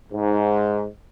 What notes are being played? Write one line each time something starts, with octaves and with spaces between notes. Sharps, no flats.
G#2